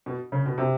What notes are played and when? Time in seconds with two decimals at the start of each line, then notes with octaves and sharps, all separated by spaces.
0.06 B2
0.32 C#3
0.46 B2
0.58 C3